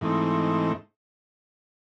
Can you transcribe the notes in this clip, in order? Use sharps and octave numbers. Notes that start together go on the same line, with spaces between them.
G#2 E3 A3 C4 D#4